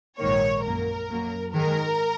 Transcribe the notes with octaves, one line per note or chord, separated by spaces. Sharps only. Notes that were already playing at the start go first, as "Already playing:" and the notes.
A#1 G#2 D#3 A#3 C#5
F#2 F#3 A#3 A#4
F#2 F#3 A#3
G#2 D#3 G#3 A#4